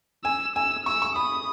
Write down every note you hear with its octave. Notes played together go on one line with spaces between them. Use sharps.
G#5 E6
G#5 E6
C#6 E6
C#6
B5 D#6